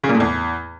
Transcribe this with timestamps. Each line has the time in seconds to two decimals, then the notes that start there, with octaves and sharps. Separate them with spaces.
0.04 C#3
0.09 A#2
0.15 A2
0.20 E2